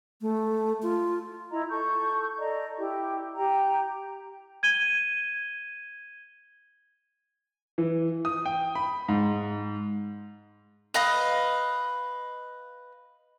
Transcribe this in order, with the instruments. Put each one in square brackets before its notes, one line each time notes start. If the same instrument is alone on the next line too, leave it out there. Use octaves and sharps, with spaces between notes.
[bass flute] A3
F4
[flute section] E4 D#5 A#5
A4 C#6 G6
A4 D5 D#5 A#5
E4 G4
G4 G5 A#5
[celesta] G#6 D#7 G7
[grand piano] E3
D#6
G5
B5
G#2
[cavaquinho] B4 D#5 F5 D#6